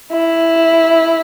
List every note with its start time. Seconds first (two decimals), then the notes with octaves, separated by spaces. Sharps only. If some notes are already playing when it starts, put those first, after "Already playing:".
0.12 E4